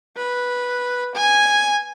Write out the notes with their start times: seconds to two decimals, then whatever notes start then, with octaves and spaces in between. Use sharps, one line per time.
0.17 B4
1.15 G#5